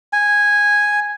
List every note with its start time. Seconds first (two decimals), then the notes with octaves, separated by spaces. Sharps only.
0.13 G#5